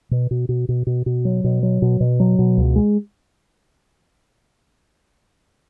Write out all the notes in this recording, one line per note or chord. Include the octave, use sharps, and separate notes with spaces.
B2
B2
B2
B2
B2
B2
F#3
B2
F#3
B2
B2
F#3
B2
C#2
G#3